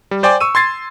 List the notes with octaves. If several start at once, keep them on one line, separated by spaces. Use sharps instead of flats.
G3
C5 D5 G5 G#5 D6
C#6 E6 D#7
C6 G#6 A6 C7